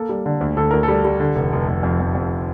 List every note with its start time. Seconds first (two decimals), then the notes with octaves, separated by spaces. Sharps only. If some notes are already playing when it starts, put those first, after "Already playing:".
Already playing: A#3 A4
0.09 G3
0.26 D3
0.41 D2
0.57 D2 A4
0.71 D2 A#4
0.83 G3 A4
1.05 G3
1.20 D3
1.36 F1
1.53 F1
1.68 F1
1.83 F2
2.00 F2
2.15 F2